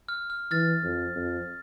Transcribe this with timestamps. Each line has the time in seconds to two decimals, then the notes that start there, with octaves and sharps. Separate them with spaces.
0.09 F6
0.30 F6
0.51 E3 F6 A6
0.84 F2
1.16 F2